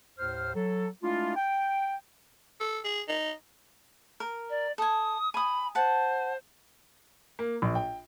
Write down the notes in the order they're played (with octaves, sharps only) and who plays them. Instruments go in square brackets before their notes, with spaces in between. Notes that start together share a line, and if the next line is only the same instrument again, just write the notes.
[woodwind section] D#2 A2 C5 F6
F#3 A4
G#3 A3 D4 E4 F4
G5
[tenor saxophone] A4
G#4
D#4
[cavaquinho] A#4
[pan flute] D5
[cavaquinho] A4 G#5 [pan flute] D#6
[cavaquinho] G#5 D#6 [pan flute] B5
[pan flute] C5 [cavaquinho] F#5 A5
[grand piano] A#3
A#1
G5